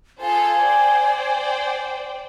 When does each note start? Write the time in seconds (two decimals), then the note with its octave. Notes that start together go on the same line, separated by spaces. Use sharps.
0.21 F4 A4 C5 G#5
0.62 C5 D5 G5